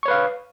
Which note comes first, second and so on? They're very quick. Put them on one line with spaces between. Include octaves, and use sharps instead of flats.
C#6 C#5 B4 F5